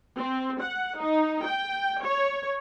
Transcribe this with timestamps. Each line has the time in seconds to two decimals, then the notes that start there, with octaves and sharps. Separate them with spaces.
0.19 C4
0.61 F#5
1.00 D#4
1.46 G5
2.02 C#5